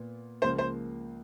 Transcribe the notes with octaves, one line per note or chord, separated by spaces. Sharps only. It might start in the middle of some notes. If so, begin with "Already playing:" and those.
Already playing: A#2 B3
C#2 C#3 F3 A#3 C5
C5